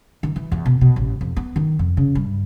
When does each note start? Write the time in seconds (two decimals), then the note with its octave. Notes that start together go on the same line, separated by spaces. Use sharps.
0.23 D#3
0.36 E3
0.52 E2
0.66 B2
0.81 B2
0.96 A1
1.21 F2
1.37 B3
1.56 D#3
1.79 F2
1.97 C#3
2.15 G2